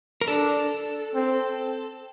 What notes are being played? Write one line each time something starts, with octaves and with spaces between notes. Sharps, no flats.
A#4
D4 A4
C4